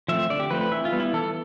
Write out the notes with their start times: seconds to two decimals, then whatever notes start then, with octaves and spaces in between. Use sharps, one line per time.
0.08 F3 A3 C4 E5
0.30 D3 D5
0.40 G4
0.51 F3 A3 C4 B4
0.61 B4
0.71 E3 E5
0.85 F4
0.92 G3 B3
1.00 E4
1.13 E3 A4